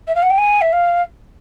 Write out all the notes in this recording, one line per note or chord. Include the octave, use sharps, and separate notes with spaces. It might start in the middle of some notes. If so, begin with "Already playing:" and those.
E5
F5
F#5
G5
G#5
E5
F5